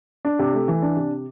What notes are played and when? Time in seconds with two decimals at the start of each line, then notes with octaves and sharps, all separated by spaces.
0.25 D4
0.39 C3
0.54 A3
0.68 E3
0.82 D4
0.96 C3